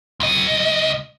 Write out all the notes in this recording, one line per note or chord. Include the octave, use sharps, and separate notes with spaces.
C#2 D#5